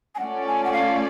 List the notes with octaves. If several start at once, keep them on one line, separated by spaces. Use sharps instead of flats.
G#5
A3 C#4 F4 A4 D5 F#5
G#5
F#5
F5